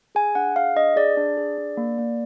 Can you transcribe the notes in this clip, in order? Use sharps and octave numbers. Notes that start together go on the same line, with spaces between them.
G#4 G#5
D4 F#5
G#4 F5
D4 D#5
G#4 D5
D4
G#4
D4
A#3
A#3